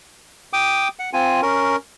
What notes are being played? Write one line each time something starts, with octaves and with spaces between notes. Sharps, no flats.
G5 D6 D#6
F#5
C4 F4 G#5
C#4 A#4